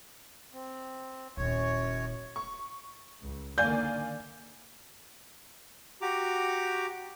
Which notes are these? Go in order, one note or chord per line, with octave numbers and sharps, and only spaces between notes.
C4
D#1 F#2 E4 C#5
C#6
C#2
D3 D#3 A#3 D5 F5 G#5 G6
F#4 G4 A#5 D6